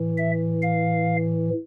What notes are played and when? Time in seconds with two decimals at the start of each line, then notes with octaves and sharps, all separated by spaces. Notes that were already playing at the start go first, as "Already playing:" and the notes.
Already playing: A2 E3
0.18 E5
0.62 F5